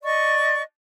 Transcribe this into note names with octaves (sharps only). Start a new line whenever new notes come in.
D5 D#5 C#6